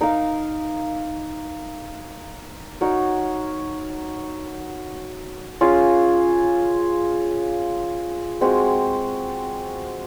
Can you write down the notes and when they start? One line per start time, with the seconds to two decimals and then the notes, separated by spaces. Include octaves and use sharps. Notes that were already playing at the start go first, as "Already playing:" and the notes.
0.01 D#4 A#4 F5
2.81 D#4 F#4 A#4 C#5
5.61 C#4 F4 G#4
8.41 G#3 C4 F#4